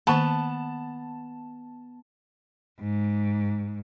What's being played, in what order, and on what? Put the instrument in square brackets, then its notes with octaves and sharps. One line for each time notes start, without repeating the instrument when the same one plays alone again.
[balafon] D#3 A#3 [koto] B3 [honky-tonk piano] A5
[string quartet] G#2